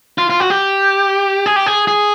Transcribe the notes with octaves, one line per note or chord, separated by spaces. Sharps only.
F4
F4
F#4
G4
G#4
G4
G#4
G#4